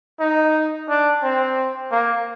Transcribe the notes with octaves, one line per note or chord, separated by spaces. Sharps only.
D#4
D4
C4
A#3